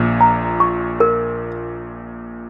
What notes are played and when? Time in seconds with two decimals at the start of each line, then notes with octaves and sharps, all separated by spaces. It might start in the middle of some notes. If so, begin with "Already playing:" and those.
Already playing: A#1 A#2
0.21 A#5
0.60 C#6
1.00 A#4